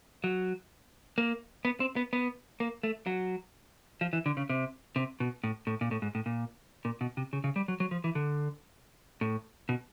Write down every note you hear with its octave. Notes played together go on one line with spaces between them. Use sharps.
F#3
A#3
B3
C4
B3
B3
A#3
A3
F#3
F3
E3
D3
C#3
C3
C3
B2
A2
A2
A#2
A2
G#2
A2
A#2
A#2
B2
C3
C#3
C#3
G3
F#3
F#3
F3
E3
D3
A2
B2